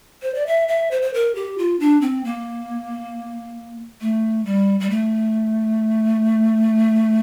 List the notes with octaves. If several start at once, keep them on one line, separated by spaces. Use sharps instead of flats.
C5
D5
E5
E5
C5
C5
A#4
G4
F4
D4
C4
A#3
A3
G3
G3
A3